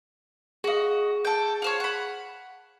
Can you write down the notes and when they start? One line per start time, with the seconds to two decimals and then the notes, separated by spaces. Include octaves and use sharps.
0.64 F#4 G#4 D#5 F5
1.25 A4 G5
1.62 F4 C5 C#5
1.80 F#5 B5